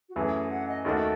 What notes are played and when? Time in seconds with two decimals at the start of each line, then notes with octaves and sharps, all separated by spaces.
0.09 F#4
0.16 F#2 E3 A3 G#4
0.50 F#5
0.68 D#5
0.85 D#2 D#3 A3 D#4 F#4 A4